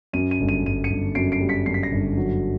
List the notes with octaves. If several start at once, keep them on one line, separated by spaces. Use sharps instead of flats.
F#2 D#7
D#7
G1
D#7
G1 D#7
C#7 D#7
G1
F#2 C7 D7
C7 D7
G3
B6 C#7
F#2 C7
B6
A#6 C7
G1
F#3